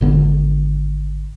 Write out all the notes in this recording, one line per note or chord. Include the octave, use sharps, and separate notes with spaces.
G#1 D3 B3